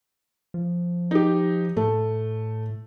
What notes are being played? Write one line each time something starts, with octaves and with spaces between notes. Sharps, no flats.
F3
D#4 G4
A2 A3